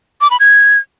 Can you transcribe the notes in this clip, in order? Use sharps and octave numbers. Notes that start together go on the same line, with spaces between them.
D6
B5
G#6